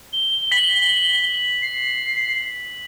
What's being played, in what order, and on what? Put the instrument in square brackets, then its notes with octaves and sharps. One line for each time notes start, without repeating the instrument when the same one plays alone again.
[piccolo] G7
[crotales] B6 F#7
[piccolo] C7